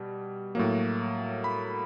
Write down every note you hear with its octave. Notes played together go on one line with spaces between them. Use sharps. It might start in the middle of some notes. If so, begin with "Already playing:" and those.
Already playing: B2 G3
A2 F#3 A#3
B5